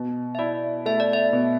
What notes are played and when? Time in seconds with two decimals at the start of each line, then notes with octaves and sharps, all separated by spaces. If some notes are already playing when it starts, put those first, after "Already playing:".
Already playing: B2
0.35 E5
0.39 E4 D5
0.86 A3 E5
1.00 D5
1.13 E5
1.33 B2